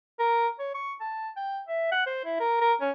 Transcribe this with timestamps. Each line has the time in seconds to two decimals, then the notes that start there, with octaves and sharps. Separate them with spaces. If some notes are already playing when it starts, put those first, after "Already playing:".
0.20 A#4
0.59 C#5
0.75 C#6
1.01 A5
1.37 G5
1.69 E5
1.92 F#5
2.07 C5
2.25 E4
2.40 A#4
2.61 A#4
2.81 C#4